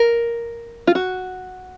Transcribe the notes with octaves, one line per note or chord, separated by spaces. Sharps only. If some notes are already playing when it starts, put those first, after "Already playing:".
Already playing: A#4
F4
F#4